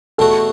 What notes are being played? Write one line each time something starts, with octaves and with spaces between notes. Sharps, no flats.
E2 B2 A3 F#4 A4